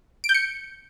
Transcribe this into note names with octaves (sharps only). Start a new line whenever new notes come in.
D7
G6
C#7